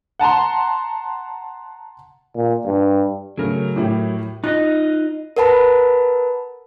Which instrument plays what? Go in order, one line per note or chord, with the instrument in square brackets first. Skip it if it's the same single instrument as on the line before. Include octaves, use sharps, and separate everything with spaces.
[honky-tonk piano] F#5 A5 A#5 C6
[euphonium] A#2
G2
[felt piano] C#3 A3 [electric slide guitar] F#3 A#4
[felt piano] A2 E4 G4
[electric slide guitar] D#4 F4 D#5 [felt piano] F#6
[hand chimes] A#4 B4 F#5 A5 B5